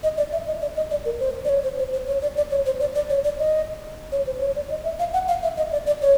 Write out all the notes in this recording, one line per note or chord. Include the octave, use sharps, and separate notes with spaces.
D#5
D5
E5
D#5
D5
D#5
D5
A#4
C5
D5
C#5
C5
C5
C5
C#5
D5
D5
C#5
C5
D5
D5
C#5
D5
D#5
C#5
C5
C#5
D5
D#5
E5
F5
F#5
F5
E5
D#5
D5
D5
C#5